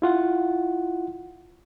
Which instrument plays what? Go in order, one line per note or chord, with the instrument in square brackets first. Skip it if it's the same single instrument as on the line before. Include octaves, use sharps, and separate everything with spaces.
[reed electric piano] E4 F4 F#5